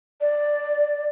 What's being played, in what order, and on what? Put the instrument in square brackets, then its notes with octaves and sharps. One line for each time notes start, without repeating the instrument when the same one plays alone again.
[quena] D5